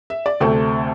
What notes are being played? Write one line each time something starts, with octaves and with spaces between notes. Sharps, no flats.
E5
D5
D2 C3 A3 C4 A4